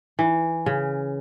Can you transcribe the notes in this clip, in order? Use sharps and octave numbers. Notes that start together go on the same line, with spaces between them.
E3
C#3